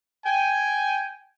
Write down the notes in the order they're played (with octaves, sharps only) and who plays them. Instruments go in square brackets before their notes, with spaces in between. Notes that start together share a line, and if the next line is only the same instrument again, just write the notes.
[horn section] G5 G#5